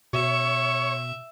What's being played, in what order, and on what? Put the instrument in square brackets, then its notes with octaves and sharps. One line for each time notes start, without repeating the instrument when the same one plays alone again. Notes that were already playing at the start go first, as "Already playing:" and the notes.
[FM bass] B2 [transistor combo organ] C#5 [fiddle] E5